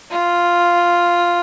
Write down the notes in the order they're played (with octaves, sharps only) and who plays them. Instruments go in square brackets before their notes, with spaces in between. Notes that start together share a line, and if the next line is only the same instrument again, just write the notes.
[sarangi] F4